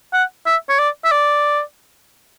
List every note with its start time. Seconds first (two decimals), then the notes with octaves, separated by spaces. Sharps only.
0.13 F#5
0.46 E5
0.69 C#5
0.79 D5
1.04 E5
1.12 D5